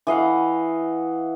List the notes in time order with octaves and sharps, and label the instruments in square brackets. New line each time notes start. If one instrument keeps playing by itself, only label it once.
[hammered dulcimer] E3 D#5 F5 F#5